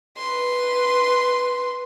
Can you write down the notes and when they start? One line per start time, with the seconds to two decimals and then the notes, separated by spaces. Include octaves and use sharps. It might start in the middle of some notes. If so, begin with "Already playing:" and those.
0.17 B4 C6